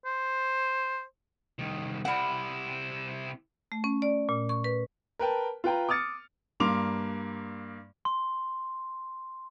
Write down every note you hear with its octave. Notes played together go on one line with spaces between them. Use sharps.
C5
C2 D#3
C3 G3 E4 F#5
A3
C#4
D5
A#2
C#6
B4
A#4 B4 G5 A5
F4 B4 G5 A#5
D6 D#6 F6 A6 C#7
G2 A#3 C6 D6 F7
C6